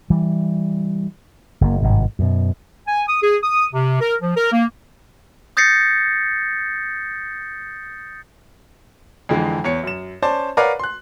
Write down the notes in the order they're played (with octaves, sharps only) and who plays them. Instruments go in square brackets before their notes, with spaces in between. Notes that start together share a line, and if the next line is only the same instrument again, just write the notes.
[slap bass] E3 G3
F#1 A#3
G#1 G2 C3
F#2 B2
[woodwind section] G#5
D#6
G#4
D#6
C3
A#4
F3
A#4
A#3
[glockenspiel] D#6 G6 A6 A#6 C7 C#7
[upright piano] F2 D3 E3 G#3
E2 C#5 C#7
F#2 E7
C#4 C5 D5 A5
A#4 B4 C#5 D5 F5 F#5
C6 F#6